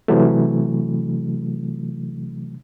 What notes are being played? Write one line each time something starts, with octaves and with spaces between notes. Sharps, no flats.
C3 E3 F#3 A3